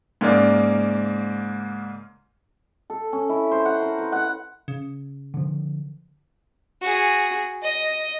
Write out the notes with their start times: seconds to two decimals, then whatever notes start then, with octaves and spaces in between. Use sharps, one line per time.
0.21 G#2 C#3 A#3 D5
2.90 A4
3.13 C#4
3.29 E4
3.51 C5
3.65 F#5
3.82 A#4
3.98 B4
4.12 F#5
4.68 C#3
5.34 D3 F3
6.81 F#4 G#4
7.62 D#5